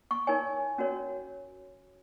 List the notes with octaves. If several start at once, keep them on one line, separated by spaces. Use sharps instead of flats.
C#6
D#4 A#4 C#5 G#5
C#4 F#4 A#4 C#5